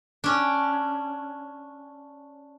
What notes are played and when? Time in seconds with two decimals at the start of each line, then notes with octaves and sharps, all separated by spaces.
0.24 C#4 D4